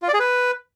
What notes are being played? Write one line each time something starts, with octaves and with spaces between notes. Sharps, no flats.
F4
D5
G#4
B4